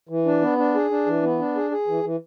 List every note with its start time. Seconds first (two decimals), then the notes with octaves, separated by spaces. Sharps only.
0.09 E3
0.26 D4
0.41 B3
0.58 D4
0.74 G#4
0.90 D4
1.06 E3
1.23 B3
1.39 D4
1.55 G#4
1.71 G#4
1.87 E3
2.04 E3